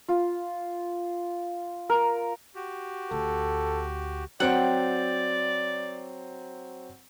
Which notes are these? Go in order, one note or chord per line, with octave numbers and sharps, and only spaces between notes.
F4
A#4
F#4 G4
D2 A4
F#3 C4 D5 F#5 G5